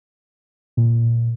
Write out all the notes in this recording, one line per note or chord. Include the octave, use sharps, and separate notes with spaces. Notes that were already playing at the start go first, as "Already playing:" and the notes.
A#2